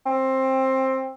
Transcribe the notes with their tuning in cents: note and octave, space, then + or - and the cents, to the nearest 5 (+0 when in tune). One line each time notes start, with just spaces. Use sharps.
C4 +15